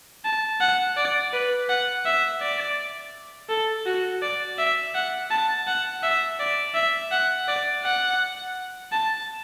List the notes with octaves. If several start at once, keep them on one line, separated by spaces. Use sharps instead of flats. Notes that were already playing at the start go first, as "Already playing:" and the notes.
A5
F#5
D5
B4
F#5
E5
D5
A4
F#4
D5
E5
F#5
A5
F#5
E5
D5
E5
F#5
D5
F#5
A5